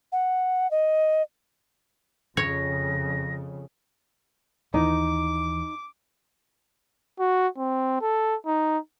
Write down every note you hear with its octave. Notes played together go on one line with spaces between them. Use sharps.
F#5
D#5
F2 C#3 C#5 A#6
D#2 E3 D#4 D6
F#4
C4
A4
D#4